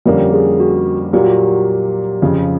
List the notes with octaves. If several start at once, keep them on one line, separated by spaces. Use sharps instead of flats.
F2 D3 G3 A#3 C#4 G4
G#4
F#4
A#2 F#3 A#3 G4
F#4
G4
F2 C#3 F3